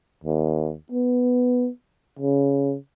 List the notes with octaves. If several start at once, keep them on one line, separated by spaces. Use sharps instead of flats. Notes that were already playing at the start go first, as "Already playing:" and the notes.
D#2
B3
C#3